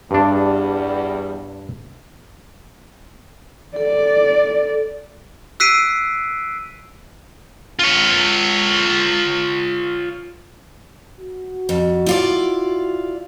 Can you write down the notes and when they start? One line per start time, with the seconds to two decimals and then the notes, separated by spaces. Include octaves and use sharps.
0.11 E2 G2 G3 D4
3.76 A4 D5
5.60 E6 F#6 B6 C7 D7 D#7
7.79 F4 C#5
11.20 F#4
11.69 F2
12.06 E4 F4 D5